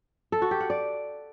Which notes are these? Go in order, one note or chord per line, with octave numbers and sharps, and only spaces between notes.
A4
F#4
G4
F#5
D5